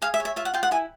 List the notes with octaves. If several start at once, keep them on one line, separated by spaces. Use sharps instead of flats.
G#4 F5
E5
C#5
E5
F4 E5
F#5
F4 G5
F#5
E4 G#5